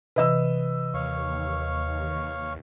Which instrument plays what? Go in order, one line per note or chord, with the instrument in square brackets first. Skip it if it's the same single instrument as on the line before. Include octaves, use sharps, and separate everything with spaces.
[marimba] C3 E3 [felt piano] B4 D#5 E6
[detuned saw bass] D#2 [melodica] C#5 F5 C#6